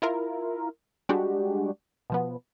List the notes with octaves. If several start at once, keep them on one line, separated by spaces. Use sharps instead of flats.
E4 F4 A#4
G3 G#3 D4 F#4 G4
B2 F3 B3